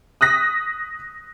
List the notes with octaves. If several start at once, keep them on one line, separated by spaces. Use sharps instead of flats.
D#6 F#6 A#6 B6